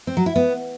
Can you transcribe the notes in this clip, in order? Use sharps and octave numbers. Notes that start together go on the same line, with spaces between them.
C4
F#3
E4
B3